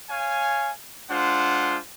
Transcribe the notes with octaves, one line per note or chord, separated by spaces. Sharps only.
C#5 F5 G#5
G#3 D4 F4 C5 F#5